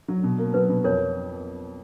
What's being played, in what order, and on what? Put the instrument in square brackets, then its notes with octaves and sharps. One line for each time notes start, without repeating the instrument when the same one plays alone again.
[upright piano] F#3
B2
A#3
[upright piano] F#3 [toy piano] B4
[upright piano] B2
[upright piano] F2 [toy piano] A#4 C#5